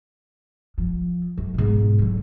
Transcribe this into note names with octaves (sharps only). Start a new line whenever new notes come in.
F3
F#2
G#2 B2
D3 F#3